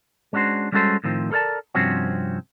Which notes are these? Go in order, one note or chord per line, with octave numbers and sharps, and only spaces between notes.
G#3 C#4 D4 F#4 C5
G3 G#3 C#4 F#4 A4 C5
A2 D#3 F3 C4
A4 A#4 C#5 D5 A5
G2 C3 F3 C4 C#4 F#4